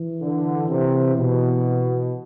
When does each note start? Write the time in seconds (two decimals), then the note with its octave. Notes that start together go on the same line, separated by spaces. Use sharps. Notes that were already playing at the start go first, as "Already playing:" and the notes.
Already playing: E3
0.21 D3
0.68 C3
1.15 B2